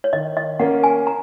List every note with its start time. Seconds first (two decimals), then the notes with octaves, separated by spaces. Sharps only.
0.04 C#5
0.13 D#3 D#5
0.37 D#5
0.60 A#3 C#4 A#4 F#5
0.84 G#5
1.07 A#5